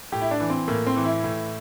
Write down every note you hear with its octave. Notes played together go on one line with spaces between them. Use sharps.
A2 G4
E4
D4
E3
C4
A2 A#3
C4
E3
E4
A2